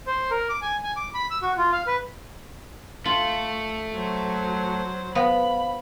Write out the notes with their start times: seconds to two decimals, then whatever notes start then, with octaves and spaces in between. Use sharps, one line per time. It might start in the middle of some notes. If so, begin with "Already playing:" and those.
0.06 C5
0.31 A#4
0.49 D6
0.62 G#5
0.84 G#5
0.96 D6
1.14 B5
1.30 E6
1.42 F#4
1.58 F4
1.72 F5
1.87 B4
3.05 A3 F4 F#7
3.94 F#3 C5
5.15 B3 C5 F5 B5